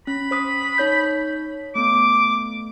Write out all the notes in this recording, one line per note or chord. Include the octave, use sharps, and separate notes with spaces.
C#4 B5
C5 D#6 B6
D#4 C#5 G6
A3 B3 D6